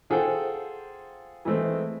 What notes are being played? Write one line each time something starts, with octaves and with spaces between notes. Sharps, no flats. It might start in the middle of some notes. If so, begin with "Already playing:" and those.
F4 G#4 A4 C5 F#5 G5
E3 G#3 A3 C4